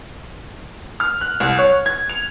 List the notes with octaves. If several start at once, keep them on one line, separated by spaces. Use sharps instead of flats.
F6
F#6
C2
C#5
G#6
F7